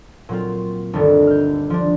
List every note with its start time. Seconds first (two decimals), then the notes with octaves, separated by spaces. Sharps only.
0.29 A#2 F#3 C4 F4
0.93 G1 D2 D#3 A3 D4
1.27 F6 G6
1.70 F3 D4